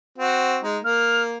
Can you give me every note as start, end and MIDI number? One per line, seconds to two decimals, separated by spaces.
0.19 0.58 60
0.19 0.58 66
0.63 0.78 56
0.63 0.78 63
0.84 1.38 58
0.84 1.23 89